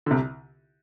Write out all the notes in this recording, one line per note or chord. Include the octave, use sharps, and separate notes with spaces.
D3
C2 C3